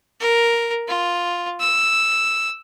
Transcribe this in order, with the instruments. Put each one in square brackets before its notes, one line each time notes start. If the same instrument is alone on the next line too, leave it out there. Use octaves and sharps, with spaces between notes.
[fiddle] A#4
F4
E6